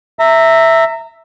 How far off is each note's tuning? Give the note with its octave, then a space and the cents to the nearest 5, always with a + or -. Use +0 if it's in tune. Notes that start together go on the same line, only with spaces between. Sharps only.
E5 +0 A#5 -25